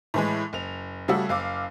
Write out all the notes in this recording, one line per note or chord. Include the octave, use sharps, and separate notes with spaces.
A2 E3 G#3
F#1 F7
C#3 G3 A3 F#4 E6
F#1 F5 D6